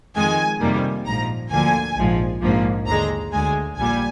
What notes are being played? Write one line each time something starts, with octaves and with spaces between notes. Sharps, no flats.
F2 D#3 G#3 G#5
F2 C3 D#3 G3 A#3
A#1 G#2 F3 A#5
D2 D3 F3 A#3 G#5
A#1 G#2 F3
A#1 G#2 F3 A#3
D#2 D3 G#3 A#5
D2 D3 G#3 G#5
A#1 A#2 G3 G#5